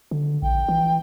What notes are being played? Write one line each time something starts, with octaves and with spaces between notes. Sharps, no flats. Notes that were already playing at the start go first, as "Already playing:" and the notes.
D3
A#1 G5
E3